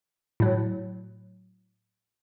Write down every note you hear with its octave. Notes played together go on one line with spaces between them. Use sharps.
A2 F#3